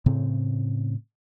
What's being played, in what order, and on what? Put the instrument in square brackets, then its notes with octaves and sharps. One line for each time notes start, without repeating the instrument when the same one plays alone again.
[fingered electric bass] A2 C#3 C4